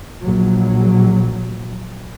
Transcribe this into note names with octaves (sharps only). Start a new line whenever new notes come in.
A#1 F#3